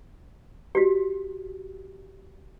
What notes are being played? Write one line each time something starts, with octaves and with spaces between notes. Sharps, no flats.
F#4 G4